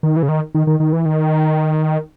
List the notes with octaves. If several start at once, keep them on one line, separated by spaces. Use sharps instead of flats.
D#3
E3
C#3
D#3
D#3
D#3
D#3
E3
D#3